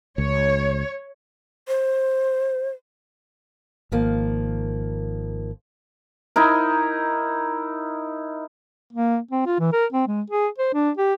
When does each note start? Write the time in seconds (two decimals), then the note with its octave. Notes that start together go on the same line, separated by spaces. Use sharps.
0.18 C#2 C#5
1.68 C5
3.92 G#1 D#3 F3 A#3
6.36 D#4 E4 A#4
8.93 A#3
9.31 C4
9.46 F4
9.59 E3
9.73 A#4
9.93 C4
10.07 G#3
10.30 G#4
10.58 C5
10.74 D4
10.97 G4